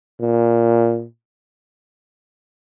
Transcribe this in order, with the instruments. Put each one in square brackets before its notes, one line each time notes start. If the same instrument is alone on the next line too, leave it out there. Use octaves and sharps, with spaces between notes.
[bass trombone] A#2